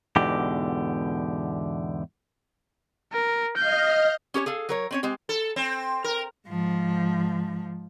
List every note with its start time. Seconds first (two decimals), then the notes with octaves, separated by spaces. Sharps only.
0.16 E2 G#2 B2 D3 G4
3.12 A#4
3.56 D#5 F5 F6 G6
4.34 C#4 G4 A#4 C#5
4.46 G#4 A4 F5
4.69 F#3 A#4 C#5
4.91 C4 C#4 C#5
5.03 G#3 C4 G4
5.29 A4
5.56 C4
6.04 A#4
6.47 G#2 F3